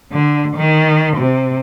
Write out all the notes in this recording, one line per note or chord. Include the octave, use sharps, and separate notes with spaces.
D3
D#3
C3